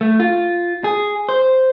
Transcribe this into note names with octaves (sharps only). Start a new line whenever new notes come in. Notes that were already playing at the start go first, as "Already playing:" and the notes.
A3
F4
G#4
C5